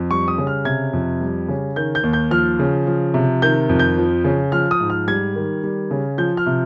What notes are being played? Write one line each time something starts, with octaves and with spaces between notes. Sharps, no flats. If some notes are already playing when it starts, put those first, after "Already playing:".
Already playing: F2
G3 C#6
D#6
C#3
F6
C3 G#6
F2
G3
C#3
D#3 G6
G6
D#2
G6
F3 F6
C#3
F3
C3
D#3 G6
F2
G6
F3
C#3
F3 F6
D#6
G#2
F6
G3 G#6
D#3
G3
C#3
F3 G6
F6
C3